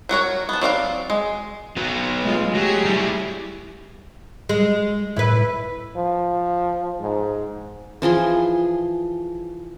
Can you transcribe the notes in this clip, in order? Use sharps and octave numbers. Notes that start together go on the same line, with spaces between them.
F#3 F#4 A#4 C#5
B3 A5
F#3 C4 D5 F5
G#3
F#3 B3
G#3 A3 F4
F#3 G4 G#4
G3 E4
G#3
A2 E4 B4
F3
G#2
E3 F3 G#4 C6